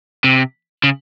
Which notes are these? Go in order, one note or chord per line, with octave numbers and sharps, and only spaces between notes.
C3
C#3